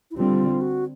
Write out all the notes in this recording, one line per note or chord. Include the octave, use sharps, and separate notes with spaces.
E4
D3 G3 C4 F4
F#4